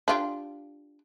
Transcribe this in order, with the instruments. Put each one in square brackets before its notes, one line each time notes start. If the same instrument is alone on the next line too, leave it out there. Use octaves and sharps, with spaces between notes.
[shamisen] D4 F4 G4